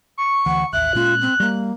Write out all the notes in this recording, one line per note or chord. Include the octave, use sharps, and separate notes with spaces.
C#6
D2 E3 F#5
A1 D#2 E5 F#6
A#2 G#3 C#4 F4
C4
G3 A#3